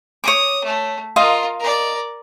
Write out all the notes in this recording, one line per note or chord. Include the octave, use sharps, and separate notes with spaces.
C#5 D6 D#6
A3
F4 A#4 D#5 F5 C6
A#4 D5